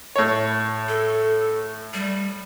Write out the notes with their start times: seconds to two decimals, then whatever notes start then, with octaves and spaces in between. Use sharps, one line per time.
0.16 A2 C#5
0.88 A4
1.94 G3